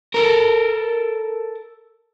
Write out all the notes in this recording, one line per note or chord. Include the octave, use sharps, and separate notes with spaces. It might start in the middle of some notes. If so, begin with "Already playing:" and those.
A4 A#4